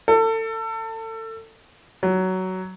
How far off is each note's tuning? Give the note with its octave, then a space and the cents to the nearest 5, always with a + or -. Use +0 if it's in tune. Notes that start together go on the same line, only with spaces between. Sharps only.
A4 +30
F#3 +15